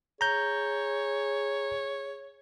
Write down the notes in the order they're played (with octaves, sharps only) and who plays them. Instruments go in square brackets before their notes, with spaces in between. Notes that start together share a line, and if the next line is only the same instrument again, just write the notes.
[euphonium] G#4 [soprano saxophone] C#5 [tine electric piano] A#5 G6